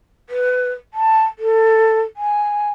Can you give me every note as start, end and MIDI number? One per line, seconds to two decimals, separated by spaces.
0.29 0.70 71
0.94 1.23 81
1.39 2.00 69
2.16 2.71 80